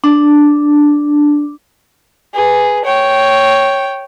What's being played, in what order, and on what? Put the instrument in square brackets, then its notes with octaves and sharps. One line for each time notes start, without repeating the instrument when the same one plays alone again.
[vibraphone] D4
[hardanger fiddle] G#4 B4
C#5 G5